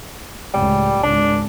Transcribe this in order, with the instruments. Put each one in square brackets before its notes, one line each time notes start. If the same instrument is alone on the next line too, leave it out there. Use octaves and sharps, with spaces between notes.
[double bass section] C#2 A2 [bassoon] G3
[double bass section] G#1 C#2 [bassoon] D4